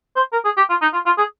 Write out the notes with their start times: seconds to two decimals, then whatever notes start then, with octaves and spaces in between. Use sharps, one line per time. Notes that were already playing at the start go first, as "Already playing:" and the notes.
0.16 C5
0.33 A#4
0.45 G#4
0.57 G4
0.70 F4
0.82 D#4
0.93 F4
1.06 F4
1.18 G#4